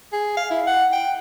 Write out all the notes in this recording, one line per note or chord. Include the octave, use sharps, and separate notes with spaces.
G#4
F5
E4
F#5
G5